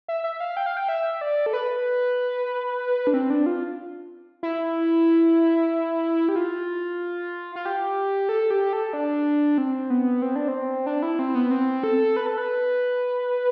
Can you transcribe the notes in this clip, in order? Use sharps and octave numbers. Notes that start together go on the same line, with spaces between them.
E5
E5
F5
G5
F5
G5
E5
D5
A4
B4
D4
C4
D4
F4
E4
G4
F4
F4
G4
A4
G4
A4
D4
C4
B3
C4
D4
C4
D4
E4
C4
B3
C4
A4
B4
A4
B4